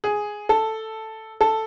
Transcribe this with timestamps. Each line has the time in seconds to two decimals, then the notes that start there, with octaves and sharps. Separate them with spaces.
0.04 G#4
0.49 A4
1.41 A4